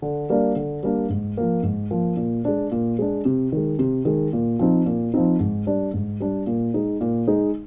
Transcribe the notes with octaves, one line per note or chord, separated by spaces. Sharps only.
D3
G3 A#3 D4
D3
G3 A#3 D4
G#2
F3 A#3
G#2
F3 A#3
A#2
G#3 D4
A#2
G#3 D4
C3
D#3 G#3
C3
D#3 G#3
A#2
F3 C4 D#4
A#2
F3 C4 D#4
G#2
G3 D4
G#2
G3 D4
A#2
G#3 D#4
A#2
G#3 D#4